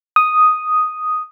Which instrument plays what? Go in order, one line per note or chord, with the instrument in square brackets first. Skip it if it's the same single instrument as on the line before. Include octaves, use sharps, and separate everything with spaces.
[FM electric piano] D#6